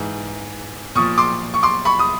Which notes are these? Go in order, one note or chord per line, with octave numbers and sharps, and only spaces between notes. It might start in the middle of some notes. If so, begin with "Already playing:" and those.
Already playing: G#2 E3
A#2 F3 C#6 D#6
C6 D6
C#6
C6 D6
B5 C#6
D#6